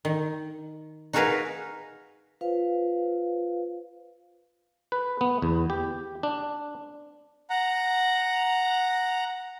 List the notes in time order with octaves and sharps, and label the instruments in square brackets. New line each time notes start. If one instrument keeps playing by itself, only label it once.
[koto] D#3
D#4 F#4 G#4 A#4 B4 F5
[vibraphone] F4 B4 C5 F5
[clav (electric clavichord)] B4
B3
E2
G4
D4
[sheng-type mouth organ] F#5 A#5